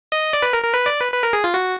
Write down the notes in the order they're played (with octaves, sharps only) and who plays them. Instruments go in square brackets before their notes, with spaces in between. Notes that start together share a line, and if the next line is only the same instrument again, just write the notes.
[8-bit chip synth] D#5
D5
B4
A#4
A#4
B4
D5
B4
B4
A#4
G#4
F4
F#4